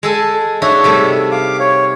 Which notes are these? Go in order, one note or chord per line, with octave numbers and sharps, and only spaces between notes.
G#3 A4 G#5
D4 D#4 F#4 C#5 E5
C3 G3 A3
F5 D6
C#5